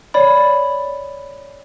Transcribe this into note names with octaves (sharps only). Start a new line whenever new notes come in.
C#5 D5 B5